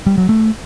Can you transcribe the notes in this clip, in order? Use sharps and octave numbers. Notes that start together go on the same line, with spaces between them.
G3
F#3
A3